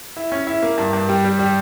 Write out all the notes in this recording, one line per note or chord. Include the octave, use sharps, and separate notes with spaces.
E4
C#4
E4
A#3
G2
G2
G3
G3
G3